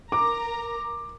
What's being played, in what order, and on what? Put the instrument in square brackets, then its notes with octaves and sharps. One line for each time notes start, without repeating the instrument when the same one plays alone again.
[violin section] A#4 A#5 [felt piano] D6